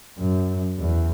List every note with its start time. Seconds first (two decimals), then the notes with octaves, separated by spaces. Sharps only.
0.19 F#2
0.79 E2